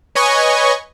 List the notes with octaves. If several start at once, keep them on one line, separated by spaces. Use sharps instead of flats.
B4 C#5 D#5 G#5 C#6